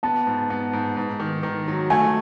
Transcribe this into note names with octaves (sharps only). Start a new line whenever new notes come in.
B3 A5
G#2
B3
G#2
G#2
D#3
D#3
F#3
A3 G#5